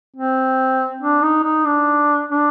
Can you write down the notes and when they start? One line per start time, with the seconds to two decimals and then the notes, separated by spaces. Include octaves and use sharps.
0.16 C4
1.01 D4
1.23 D#4
1.44 D#4
1.65 D4
2.29 D4